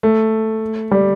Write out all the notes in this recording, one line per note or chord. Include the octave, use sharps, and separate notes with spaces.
A3
G3